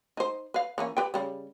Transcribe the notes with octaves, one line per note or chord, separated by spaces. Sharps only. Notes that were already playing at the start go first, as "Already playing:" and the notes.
D#4 C5
B4 F5
E3 A#3 C#4
G4 B4 G5
C#3 G3